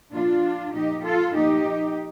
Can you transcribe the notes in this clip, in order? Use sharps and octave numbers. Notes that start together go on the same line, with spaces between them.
A#2 F3 D4 F4
A#2 F3 D#4 G4
F4 A4
A#2 F3 D#4 G4